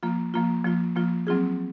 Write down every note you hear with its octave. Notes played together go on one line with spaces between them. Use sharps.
F3 A#3 F4
F3 A#3 F4
F3 A#3 F4
F3 A#3 F4
F#3 C4 F4 G#4